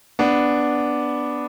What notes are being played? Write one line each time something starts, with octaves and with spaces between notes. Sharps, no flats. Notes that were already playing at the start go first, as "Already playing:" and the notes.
B3 D4